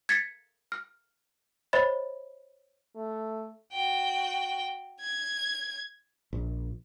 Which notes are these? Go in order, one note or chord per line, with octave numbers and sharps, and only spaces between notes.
G#6 A6 B6 C#7
F6
C5 C#5 D#5 B5 A6
A3
F#4 G5
G#6
A#1